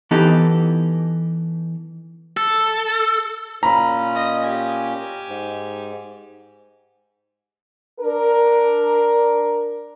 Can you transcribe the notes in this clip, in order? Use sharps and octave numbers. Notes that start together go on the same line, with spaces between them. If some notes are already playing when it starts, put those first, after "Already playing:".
E3 B3 D#4 G4 A4
A4
A#2 C#4 A#5 B5
D#5
G4 G#5
G#2
D4 A#4